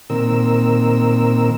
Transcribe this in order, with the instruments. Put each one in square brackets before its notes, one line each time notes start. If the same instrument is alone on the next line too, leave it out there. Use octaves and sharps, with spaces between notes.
[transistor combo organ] A#2 D#3 C4 A#4 E6